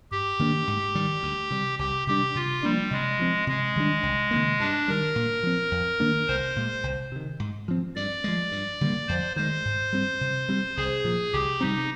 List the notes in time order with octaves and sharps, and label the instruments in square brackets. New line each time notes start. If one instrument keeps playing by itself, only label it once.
[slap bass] G2 [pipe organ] G4
[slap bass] D#3 A#3 D4
G#2
D#3 G3
D2
C3 G3
[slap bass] C2 [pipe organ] G4
[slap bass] C3 G3 D4 [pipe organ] G4
[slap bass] C3 [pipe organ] F4
[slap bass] F3 A#3 D4 [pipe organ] G3
[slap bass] C3 [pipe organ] G#3
[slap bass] F3 C4
[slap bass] C3 [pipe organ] G#3
[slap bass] D#3 G3 D4
C2
C3 D#3 A#3
[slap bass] G2 [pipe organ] D4
[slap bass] D#3 G3 [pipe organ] A#4
[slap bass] A#2
F3 C4
F2
D#3 A#3 D4
[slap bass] C2 [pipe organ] C5
[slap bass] A#2 G#3
C2
C3 D#3
G#2
F3 C4
[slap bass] G2 [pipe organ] D5
[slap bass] F3 G#3
G2
D3 G3 A#3
[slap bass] F2 [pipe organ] C5
[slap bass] D#3 G#3 [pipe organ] C5
[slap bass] G#2
G3 C4
C3
G3 C4
[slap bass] C2 [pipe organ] G#4
[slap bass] A#2 F3
[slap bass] C2 [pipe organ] G4
[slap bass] C3 G3 C4 [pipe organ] D#4